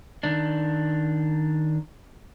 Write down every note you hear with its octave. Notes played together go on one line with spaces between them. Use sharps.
D#3 D4